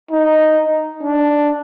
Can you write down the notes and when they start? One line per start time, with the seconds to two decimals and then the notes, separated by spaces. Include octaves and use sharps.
0.11 D#4
1.03 D4